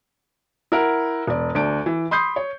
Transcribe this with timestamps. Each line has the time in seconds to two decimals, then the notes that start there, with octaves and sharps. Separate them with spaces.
0.72 E4 A#4 F#5
1.27 E1 D5
1.55 D2 D4 D7
1.86 E3
2.11 B5 C6 D#6 G6 C7
2.36 C#5